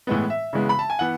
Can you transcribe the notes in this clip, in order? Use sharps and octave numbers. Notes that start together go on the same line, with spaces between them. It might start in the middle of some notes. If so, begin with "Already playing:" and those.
A2 E3 G#3 B3
E5
C#3 E3 G#3 B3
B5
A5
G#5
E3 B3 F#5